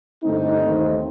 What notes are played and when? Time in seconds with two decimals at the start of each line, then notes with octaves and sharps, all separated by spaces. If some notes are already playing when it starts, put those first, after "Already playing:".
0.23 G2 D3 A3 C4 D#4
0.62 D#2 D#3 A3 C4